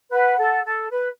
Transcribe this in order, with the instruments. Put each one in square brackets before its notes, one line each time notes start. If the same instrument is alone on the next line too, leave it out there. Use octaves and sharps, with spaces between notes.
[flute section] B4 [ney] F#5
[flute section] A4
A4
B4